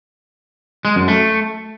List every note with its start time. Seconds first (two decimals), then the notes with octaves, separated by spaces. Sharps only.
0.85 G#3
0.96 F#2
1.08 A3